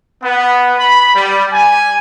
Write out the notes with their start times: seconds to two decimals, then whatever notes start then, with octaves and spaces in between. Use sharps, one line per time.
0.24 B3
0.78 B5
1.14 G3
1.53 G#5